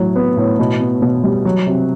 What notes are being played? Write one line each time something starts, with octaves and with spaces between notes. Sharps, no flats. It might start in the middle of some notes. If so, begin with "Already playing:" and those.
Already playing: A2 F#3
B3
A2
B2
B3
B2
G3
F#3
C3